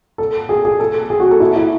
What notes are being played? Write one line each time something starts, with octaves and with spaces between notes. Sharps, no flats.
A4
G#4
G#4
A4
G#4
F#4
A4
E4
E4